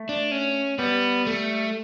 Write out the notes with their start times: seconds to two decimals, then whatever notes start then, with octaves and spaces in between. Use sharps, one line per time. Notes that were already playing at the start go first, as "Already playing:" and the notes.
Already playing: A3
0.09 D4
0.31 C#4
0.79 G3 B3
1.27 A3